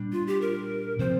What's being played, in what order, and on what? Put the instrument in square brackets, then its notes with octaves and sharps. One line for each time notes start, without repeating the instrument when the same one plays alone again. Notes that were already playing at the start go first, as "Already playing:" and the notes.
Already playing: [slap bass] A#2 G3 D4
[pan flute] F4
G4
A#4
[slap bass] C3 F3 C4 [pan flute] C5